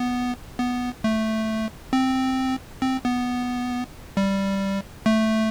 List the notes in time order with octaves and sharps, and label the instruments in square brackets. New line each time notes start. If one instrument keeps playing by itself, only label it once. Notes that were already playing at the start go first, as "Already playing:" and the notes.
Already playing: [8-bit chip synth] B3
B3
A3
C4
C4
B3
G3
A3